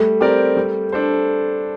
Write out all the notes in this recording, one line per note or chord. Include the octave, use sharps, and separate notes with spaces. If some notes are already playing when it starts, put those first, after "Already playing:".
Already playing: G3 A3
C4 G4 A#4 D5
G3
D4 A4 C5